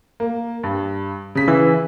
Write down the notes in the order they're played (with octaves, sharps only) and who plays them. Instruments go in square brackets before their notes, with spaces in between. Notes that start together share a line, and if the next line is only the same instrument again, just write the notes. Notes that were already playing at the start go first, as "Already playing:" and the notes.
[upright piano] A#3
G2
C#3 B6
[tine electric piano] E3